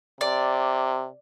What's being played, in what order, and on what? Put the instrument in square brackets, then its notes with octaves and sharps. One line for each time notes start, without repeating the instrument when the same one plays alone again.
[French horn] C3 [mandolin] D5